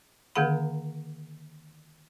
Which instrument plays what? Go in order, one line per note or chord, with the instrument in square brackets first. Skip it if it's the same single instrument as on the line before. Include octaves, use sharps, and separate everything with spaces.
[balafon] D3 D#3 A#3 G#4 F#5 B5